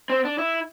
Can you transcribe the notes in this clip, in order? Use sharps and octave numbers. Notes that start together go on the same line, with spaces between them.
C4
D4
E4